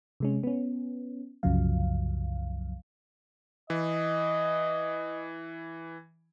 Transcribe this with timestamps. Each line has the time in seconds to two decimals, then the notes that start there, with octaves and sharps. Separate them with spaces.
0.20 C3 G#3 C#4
0.43 B3 C#4
1.43 C2 F#2 C#3 F3 F#3 F5
3.70 E3 D#5